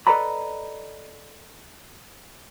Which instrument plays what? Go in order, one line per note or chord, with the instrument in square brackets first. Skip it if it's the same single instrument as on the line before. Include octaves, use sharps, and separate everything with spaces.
[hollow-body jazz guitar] A4 B4 D5 D#5 A#5 B5